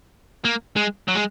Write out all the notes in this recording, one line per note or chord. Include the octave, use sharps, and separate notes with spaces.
A#3
G#3
F#3
G#3